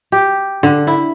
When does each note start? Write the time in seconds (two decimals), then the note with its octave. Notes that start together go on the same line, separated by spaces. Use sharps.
0.12 G4
0.63 D3
0.87 E4